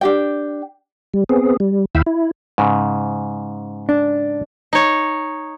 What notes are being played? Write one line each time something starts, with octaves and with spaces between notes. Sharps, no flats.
D4 G4 G5
G3
B3 C4 G#4
G3
D#2 E4 F5 G5 B5 E6
E4
G#2 C#3
D4
D#4 C#5